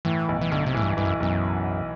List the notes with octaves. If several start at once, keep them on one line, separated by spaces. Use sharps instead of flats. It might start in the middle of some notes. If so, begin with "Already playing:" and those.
A2 E3
B1
E3
B1 D3
C3
A2 E3
G2
G2 E3
F#2
B1 F#2